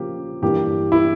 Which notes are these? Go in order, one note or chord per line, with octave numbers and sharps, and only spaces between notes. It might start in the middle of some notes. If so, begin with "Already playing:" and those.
Already playing: C#3 F3 A#3 G4
G2 E3 A#3 G4
E4